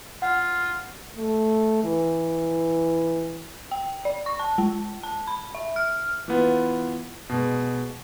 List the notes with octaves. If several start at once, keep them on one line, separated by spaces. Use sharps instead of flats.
F4 F#5
A3
E3
G5
D5
C#6
A5
G#3
A5
B5
E5
F6
E3 B3 F4
B2 G#3